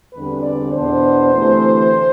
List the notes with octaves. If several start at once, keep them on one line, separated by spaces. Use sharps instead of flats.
E2 D3 G3 C4 B4
D5
E2 B2 B3 D4 C5
D2 C3 E3 A3